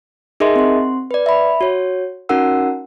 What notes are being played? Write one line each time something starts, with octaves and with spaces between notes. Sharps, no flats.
D#4 G#4 A#4 D#5 E5 C6
C4 C6
B4 D5
E5 B5
F#4 C#5
C#4 D#4 F#4 A#4 F#5 E6